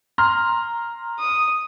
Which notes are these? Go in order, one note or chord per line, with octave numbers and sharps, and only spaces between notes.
A#5 C6 F6
D#6